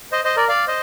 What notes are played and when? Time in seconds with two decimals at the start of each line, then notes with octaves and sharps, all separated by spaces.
0.12 C5 D#5
0.24 C5 D#5
0.37 A#4 D5
0.49 D5 F5
0.67 C5 D#5